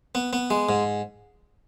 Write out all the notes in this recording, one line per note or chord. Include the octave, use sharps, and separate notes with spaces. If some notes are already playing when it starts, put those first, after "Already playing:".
B3
B3
G#3
G#2